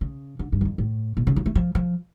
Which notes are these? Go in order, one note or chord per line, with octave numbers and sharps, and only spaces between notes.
C#3
D3
G2
E2
F2
A2
A#2
C#3
F3
A3
F3
F3